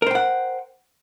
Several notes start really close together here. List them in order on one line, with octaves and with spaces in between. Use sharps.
A#4 C5 G5 F#5